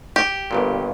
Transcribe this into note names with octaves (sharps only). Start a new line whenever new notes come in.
G4
G1 G2 A#2